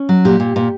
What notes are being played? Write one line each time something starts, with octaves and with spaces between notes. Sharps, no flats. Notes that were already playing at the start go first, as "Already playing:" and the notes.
Already playing: C#4
F#3
A#2 G4
A#2
A#2